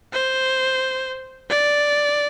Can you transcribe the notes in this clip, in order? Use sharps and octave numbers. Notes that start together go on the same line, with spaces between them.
C5
D5